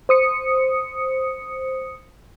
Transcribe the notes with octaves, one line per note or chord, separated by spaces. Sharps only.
C5 D#6 C#7